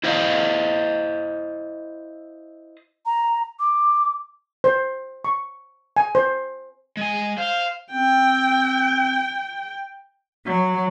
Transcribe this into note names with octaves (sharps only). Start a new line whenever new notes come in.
E4 C5 D#5 F5
A#5
D6
C5
C#6
G#5
C5
G#3 G#5
C5 F5
C4 G5
F#3